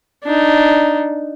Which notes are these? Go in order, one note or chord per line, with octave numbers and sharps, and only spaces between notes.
D4 D#4